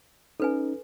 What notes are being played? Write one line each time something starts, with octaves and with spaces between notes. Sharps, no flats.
C#4 D#4 A4 B4 G#5